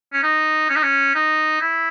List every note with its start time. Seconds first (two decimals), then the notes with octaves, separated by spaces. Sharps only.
0.13 C#4
0.23 D#4
0.69 C#4
0.76 D#4
0.83 C#4
1.15 D#4
1.61 E4